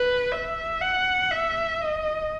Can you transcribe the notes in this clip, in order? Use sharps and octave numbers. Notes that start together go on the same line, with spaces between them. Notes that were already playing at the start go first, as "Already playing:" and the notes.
Already playing: B4
E5
F#5
E5
D#5